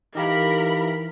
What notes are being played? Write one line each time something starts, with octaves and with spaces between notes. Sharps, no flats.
E3 D#4 G4 A#4 F5 B5